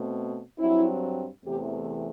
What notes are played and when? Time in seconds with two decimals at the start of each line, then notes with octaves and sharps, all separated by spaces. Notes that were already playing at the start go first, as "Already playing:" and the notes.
Already playing: B2 A3 C4
0.59 G2 F#3 C4 E4
1.44 E2 C3 E3 A3 C4 G4